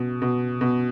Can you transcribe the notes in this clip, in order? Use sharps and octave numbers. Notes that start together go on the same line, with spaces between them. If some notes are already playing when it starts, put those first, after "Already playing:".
Already playing: B2
B2
B2